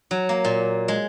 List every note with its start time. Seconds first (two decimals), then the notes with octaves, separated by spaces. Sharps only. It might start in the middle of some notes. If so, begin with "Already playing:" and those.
0.11 F#3
0.29 A#3
0.45 A#2
0.88 G#3